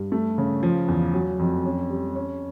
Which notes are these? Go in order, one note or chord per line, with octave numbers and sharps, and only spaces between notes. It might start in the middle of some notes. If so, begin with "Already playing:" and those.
Already playing: G2
A3
C#3
F3
E2
F#3
F2
C#4
G3
C#4